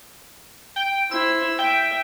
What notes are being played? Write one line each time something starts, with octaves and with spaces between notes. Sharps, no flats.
G5
E4 C5 E6
E5 G5